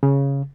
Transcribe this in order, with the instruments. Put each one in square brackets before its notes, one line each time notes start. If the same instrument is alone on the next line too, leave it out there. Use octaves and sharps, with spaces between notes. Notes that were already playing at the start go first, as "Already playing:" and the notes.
[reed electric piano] C#3